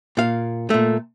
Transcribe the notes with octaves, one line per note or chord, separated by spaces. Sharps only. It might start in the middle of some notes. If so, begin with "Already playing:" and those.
A#2 F5
A#2 A3